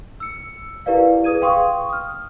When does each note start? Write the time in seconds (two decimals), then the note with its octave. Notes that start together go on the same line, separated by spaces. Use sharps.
0.20 E6 C#7
0.86 E4 G4 A#4 B4 D5 F5
1.24 G#4 B4 D#6 G#6 D#7
1.41 F5 G5 C6 C#6 D#6
1.89 D#6 F6